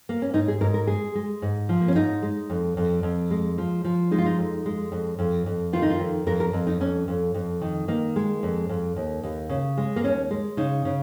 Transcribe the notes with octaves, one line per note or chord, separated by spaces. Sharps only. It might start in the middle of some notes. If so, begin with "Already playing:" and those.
A#3
C#4
G#2 D#4
G#4
G#2 A#4
A#4
G#3 G#4
G#3
G#2
F3
A#3
C#4
G#2 D#4
G#3
F2
F2
F2
G#3
F3
F3
G#3 D#4
F4
D#4
F2
G#3
F2
F2
F2
D#3 F4
D#4
F4
F2
F2 A#4
A#4
F2
D#4
F2 C#4
F2
F2
D#3
D#3 A#3
G#3
F2
F2
D#2
D#2
C#3
G#3
A#3
D#2 C#4
G#3
C#3 D#4
C#3